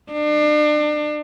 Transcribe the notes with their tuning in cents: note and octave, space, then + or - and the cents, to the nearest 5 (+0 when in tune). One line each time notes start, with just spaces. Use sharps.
D4 +35